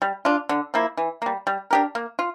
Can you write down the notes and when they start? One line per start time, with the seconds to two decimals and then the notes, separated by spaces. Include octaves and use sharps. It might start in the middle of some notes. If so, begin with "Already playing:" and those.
0.02 G3
0.25 D4 F4
0.49 D3
0.74 F3 A#3 E4
0.97 E3
1.22 G3 A#3
1.47 G3
1.71 D4 G4 A#4
1.95 A#3
2.19 F4